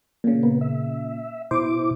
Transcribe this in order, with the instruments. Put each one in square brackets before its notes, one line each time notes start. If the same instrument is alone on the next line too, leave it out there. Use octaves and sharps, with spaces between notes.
[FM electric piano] A#2 C#3
[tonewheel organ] A#3 B3
E5
[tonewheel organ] B2 E4 D6 [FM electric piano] C5